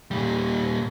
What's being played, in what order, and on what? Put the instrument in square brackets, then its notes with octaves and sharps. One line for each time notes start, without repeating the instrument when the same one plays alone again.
[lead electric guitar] A#2 G3